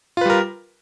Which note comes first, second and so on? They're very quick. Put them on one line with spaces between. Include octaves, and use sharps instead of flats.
F4 B4 G3 A#4